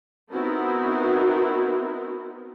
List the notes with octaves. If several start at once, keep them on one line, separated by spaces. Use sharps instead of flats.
B3 C4 D#4 E4 F#4 A#4